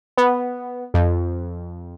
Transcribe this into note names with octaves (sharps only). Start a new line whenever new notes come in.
B3
F2